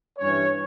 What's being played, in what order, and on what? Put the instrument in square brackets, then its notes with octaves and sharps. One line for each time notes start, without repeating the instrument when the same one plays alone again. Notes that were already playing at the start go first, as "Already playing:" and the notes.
[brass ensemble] G2 E3 G3 C#4 C#5